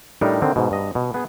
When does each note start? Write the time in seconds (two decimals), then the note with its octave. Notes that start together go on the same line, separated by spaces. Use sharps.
0.21 A2 G3 D4 D#4 A#4
0.42 D3 D#3 C4
0.56 G#2 B2
0.71 G2 D#5
0.95 B2
1.14 B3 G#4